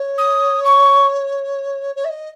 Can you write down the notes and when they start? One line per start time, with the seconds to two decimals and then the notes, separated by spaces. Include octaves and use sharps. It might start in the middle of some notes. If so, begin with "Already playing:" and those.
Already playing: C#5
0.18 D#6
0.64 C#6
1.95 C#5
2.04 E5
2.09 D#5